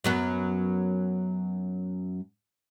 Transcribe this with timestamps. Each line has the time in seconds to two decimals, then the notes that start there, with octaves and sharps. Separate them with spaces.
0.04 F#2 F#3 B3